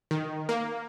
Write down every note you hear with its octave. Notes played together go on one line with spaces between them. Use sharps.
D#3
A#3